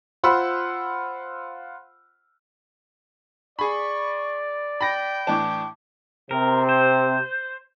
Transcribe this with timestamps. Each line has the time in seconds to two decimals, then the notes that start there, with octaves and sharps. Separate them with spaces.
0.23 F4 C5 F#5 B5 C6 E6
3.59 G#4 D5 B5 C#6
4.81 G5 B5 A#6
5.27 A2 E3 D4 A5 D6
6.31 C3 C4 A#4
6.69 C5